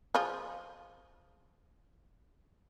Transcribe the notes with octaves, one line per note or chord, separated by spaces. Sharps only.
F3 F4 G#4